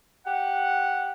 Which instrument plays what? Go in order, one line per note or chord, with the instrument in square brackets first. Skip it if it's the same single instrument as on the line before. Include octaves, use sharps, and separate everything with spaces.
[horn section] G4 F#5